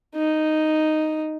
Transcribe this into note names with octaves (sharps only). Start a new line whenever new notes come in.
D#4